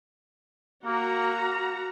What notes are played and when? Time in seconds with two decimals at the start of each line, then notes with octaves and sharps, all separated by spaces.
0.86 A#3 F#4 A#5